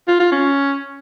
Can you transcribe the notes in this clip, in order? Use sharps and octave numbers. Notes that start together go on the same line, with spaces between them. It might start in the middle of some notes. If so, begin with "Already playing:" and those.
F4
F4
C#4